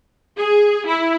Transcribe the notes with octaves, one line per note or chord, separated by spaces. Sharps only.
G#4
E4